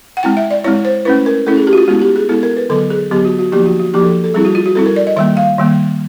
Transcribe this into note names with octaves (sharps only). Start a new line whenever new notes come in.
F#5
G#3 C4 E4 G5
E5
D5
G#3 C4 E4 C#5
C5
A3 C#4 E4 B4
A#4
A3 C#4 E4 A4
G#4
G4
F#4
F4
G#3 B3 E4 F#4
G4
G#4
G#3 B3 E4 A4
A#4
B4
D3 F#3 B3 A4
G#4
D3 F#3 B3 G4
F#4
F#4
F3 A#3 D#4 G4
F#4
F#4
F3 A#3 D#4 G4
A4
A4
G3 C4 E4 G#4
F#4
F4
F#4
G3 C4 E4 A4
A#4
D5
D#5
D#3 G3 A#3 E5
F5
D#3 G3 A#3